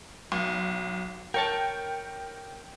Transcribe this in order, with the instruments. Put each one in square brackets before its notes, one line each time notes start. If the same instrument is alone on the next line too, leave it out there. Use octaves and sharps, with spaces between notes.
[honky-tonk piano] B1
[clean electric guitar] A#4 C#5 A5 [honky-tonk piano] G5